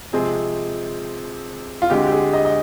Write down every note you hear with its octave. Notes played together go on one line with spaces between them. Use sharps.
C3 F3 G#3 C4 G#4
F4
D2 D3 G#3 C4 G4
G4
G#4
D#5
D#5